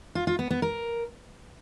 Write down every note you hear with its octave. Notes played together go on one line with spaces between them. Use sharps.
F4
F4
B3
B3
A#4